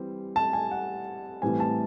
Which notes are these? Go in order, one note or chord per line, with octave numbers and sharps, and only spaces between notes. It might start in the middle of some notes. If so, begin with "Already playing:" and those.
Already playing: E3 G3 C4
A5
G#5
F#5
A2 E3 G3 C4 G#5
A5